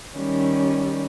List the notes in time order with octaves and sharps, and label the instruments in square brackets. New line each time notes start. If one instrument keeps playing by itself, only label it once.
[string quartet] D#3 G3 C#4